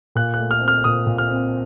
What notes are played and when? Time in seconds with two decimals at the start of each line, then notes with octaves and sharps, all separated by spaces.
0.15 A#2 F#6
0.34 A3 F#6
0.51 F6
0.61 C4
0.68 F6
0.84 A#2 D#6
1.07 A#2
1.18 F6
1.30 C4